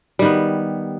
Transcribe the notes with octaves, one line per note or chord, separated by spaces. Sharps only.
D#3 G3 B3